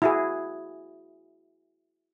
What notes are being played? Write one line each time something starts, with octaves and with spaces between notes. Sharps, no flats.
E4 F#4 G#4